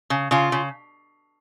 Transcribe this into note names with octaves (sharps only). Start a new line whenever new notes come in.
C#3
C#3 F4
C#3